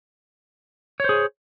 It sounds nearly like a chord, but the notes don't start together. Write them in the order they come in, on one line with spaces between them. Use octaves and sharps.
C#5 C5 G#4